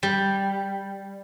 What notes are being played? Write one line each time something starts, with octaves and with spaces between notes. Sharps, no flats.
G3